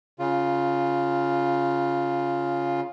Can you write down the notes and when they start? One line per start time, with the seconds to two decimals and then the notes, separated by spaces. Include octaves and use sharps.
0.19 C#3 F4